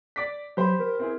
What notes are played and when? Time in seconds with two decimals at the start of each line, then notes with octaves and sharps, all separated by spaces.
0.16 D5 D6 B6
0.57 F#3 G4 C5 B5
0.79 A#4
0.99 C4 E4 G#4